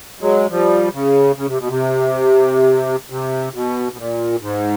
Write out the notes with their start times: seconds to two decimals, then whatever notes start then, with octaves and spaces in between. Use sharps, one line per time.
0.21 F#3 G#3
0.50 F3 G3
0.93 C#3
1.36 C#3
1.47 C3
1.58 B2
1.68 C3
3.10 C3
3.54 B2
3.92 B2
3.97 A#2
4.40 G#2